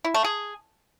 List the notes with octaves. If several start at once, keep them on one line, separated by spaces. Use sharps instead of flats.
E4
A3
G#4